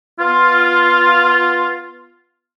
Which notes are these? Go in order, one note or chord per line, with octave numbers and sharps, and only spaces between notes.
B3 F4